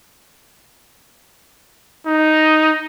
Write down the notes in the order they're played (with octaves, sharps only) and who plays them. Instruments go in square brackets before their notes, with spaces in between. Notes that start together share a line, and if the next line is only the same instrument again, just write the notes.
[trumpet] D#4